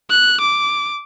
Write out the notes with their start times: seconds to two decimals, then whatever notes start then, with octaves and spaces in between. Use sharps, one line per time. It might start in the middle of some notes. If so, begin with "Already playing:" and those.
0.11 F#6
0.41 D6